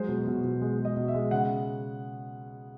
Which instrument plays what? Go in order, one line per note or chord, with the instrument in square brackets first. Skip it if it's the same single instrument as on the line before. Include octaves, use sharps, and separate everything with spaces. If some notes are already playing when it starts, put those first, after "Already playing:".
Already playing: [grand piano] F#3 G#3 C5
B2
B2
B2
G#3
G#3
D#5
B2
E5
G#3
C#3 F#5